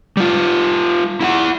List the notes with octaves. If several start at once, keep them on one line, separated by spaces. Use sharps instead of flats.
G3 F4
E4 F5 F#5